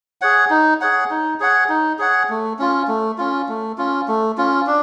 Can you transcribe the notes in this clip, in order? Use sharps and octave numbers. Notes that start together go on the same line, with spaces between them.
G#4 C#5 F#5
D#4
G#4 C#5 F#5
D#4
G#4 C#5 F#5
D#4
G#4 C#5 F#5
A3
C#4 F4
A3
C#4 F4
A3
C#4 F4
A3
C#4 F4
D4